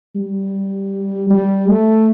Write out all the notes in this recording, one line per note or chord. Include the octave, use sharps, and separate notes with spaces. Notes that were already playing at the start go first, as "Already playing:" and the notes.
G3
G3
A3